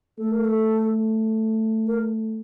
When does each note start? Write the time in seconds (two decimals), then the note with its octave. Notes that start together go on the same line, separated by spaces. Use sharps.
0.18 A3 A4
0.31 A#4
0.45 A4
1.87 A#4